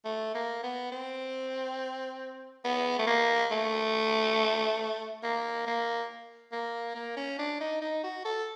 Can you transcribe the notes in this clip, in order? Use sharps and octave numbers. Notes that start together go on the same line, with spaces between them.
A3
A#3
B3
C4
B3
A3
A#3
A3
A#3
A#3
A#3
A#3
C#4
D4
D#4
D#4
F#4
A4